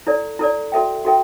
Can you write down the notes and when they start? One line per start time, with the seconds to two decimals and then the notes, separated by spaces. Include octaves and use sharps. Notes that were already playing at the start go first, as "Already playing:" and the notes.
0.07 E4 A4 D5
0.39 E4 A4 D5
0.72 F#4 A4 E5 G5
1.05 F#4 A4 E5 G5